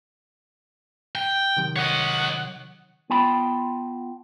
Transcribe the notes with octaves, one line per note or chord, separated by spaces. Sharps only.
G5
C3 D#3 F#3
C#5 D#5 F#5
B3 F4 G5 A5 B5